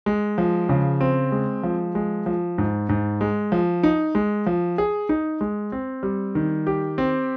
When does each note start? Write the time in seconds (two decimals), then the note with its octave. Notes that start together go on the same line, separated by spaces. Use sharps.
0.06 G#3
0.38 F3
0.69 C#3
1.01 C4
1.32 G#3
1.63 F3
1.95 G#3
2.26 F3
2.58 G#2
2.89 G#2
3.21 G#3
3.52 F3
3.83 D#4
4.15 G#3
4.46 F3
4.78 G#4
5.09 D#4
5.41 G#3
5.72 C4
6.03 G3
6.35 D#3
6.67 G4
6.98 C4